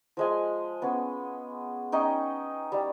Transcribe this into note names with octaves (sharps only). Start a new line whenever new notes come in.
F3 G#3 G#5
B3 C#4
C#4 D#4 D#5 G5
G3